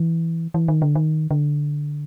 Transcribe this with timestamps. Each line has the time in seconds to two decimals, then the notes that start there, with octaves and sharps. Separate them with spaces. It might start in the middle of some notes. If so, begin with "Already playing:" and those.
Already playing: E3
0.54 E3
0.68 D#3
0.82 D3
0.95 D#3
1.31 D3